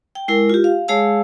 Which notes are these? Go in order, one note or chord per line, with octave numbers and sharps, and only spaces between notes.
G5
G#3 E4 A#4
F4 G4
F5
G#3 G#4 C#5 F5 A5 E6